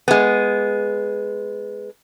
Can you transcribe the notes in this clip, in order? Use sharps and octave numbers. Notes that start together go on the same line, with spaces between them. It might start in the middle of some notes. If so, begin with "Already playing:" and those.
G#3 B3